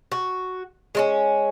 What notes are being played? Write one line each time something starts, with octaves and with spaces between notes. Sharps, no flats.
F#4
G#3 C4 C#4